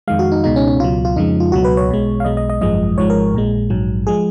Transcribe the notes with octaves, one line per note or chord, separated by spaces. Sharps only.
F2 D#3 G#3 F5
F#4
D#4
C#2 B2 G#3 D#4
C#4
C#4
C#2 B2 F#3 F4
F4
F2 C#3 F3 G#3 D#4
F4
C#2 B2 F#3 F#4
B4
C#5
B1 B2 G#3
F5
B1 B2 G#3 D#5
D#5
D#5
G#1 F#2 F3 G#3 D#5
G#1 G#2 F3 G#3 C#5
A#4
A#1 A#2 G#3
A#1 G#2 F#3
F3 G#3 G#4